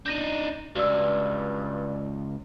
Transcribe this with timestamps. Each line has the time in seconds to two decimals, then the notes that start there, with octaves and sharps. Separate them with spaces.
0.06 D4 D#4 G6 A#6 D#7
0.75 C#2 G2 F#4 D5 E6